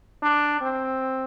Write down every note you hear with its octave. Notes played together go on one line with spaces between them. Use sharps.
D4
C4